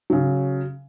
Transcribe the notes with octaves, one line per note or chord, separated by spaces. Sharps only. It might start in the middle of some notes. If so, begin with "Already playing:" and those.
C#3 F#3